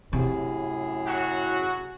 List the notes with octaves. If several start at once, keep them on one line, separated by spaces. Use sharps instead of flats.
F#2 A2 C3 G#4
F#3 C#4 F#4